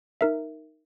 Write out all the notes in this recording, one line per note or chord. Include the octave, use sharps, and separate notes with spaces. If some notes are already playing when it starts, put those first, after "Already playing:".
D#4 A#4 E5